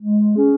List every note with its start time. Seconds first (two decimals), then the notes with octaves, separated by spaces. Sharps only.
0.02 G#3
0.36 C#4 G#4